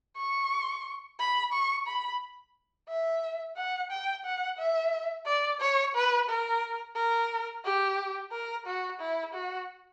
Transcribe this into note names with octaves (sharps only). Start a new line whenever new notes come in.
C#6
B5
C#6
B5
E5
F#5
G5
F#5
E5
D5
C#5
B4
A#4
A#4
G4
A#4
F#4
E4
F#4